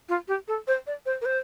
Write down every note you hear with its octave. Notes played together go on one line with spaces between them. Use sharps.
F4
G4
A4
C5
D5
C5
A#4
C5